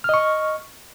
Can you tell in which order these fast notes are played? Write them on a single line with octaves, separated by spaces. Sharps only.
F6 D#5 C#6